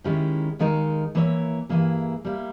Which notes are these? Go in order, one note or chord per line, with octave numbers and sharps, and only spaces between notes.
D#3 G#3 C#4 E4 G4
D#2 D#3 G#3 D#4 A#4
E3 A#3 E4 A#4 C#5
G2 E3 A#3 E4 G#4
G3 A#3 E4